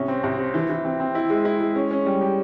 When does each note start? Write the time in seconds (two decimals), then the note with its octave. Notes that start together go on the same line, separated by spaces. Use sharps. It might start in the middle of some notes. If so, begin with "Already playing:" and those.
Already playing: C2 C#4
0.08 C4
0.23 C2
0.39 C4
0.54 E3
0.69 E3
0.85 C4
1.00 C4
1.15 E4
1.30 G#3
1.45 E4
1.60 G#3
1.76 C#4
1.91 C#4
2.06 G3
2.21 G4